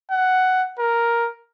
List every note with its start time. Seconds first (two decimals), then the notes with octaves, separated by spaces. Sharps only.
0.11 F#5
0.79 A#4